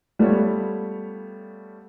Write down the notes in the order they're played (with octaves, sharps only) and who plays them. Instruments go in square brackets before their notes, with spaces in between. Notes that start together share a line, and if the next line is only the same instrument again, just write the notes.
[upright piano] G3 A3 B3 F4 C#5